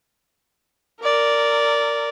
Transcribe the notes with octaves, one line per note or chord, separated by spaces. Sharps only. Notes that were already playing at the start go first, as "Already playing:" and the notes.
A#4 D5